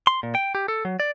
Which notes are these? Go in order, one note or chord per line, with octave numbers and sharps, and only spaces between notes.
C6
A#2
G5
G4
A4
F#3
D5